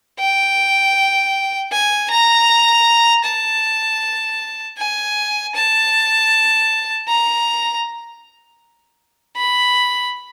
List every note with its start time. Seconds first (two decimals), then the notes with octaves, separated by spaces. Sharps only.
0.20 G5
1.72 G#5
2.10 A#5
3.25 A5
4.78 G#5
5.55 A5
7.08 A#5
9.37 B5